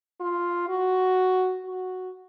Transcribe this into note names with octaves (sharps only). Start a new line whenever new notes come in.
F4
F#4
F#4